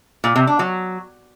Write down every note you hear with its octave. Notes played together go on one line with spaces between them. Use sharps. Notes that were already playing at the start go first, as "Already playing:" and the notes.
A#2
C3
D4
F#3